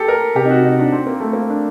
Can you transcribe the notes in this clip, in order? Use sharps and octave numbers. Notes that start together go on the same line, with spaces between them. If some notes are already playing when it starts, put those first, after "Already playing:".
Already playing: G4 A4
A#4
C3 G4
D#4
F#4
D#4
D4
C4
A#3
A3
A#3
D4